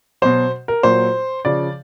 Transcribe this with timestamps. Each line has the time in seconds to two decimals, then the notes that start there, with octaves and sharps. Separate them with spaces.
0.22 B2 F#3 C5
0.68 A#4
0.83 A#2 F#3 C5
1.45 C#3 F3 D5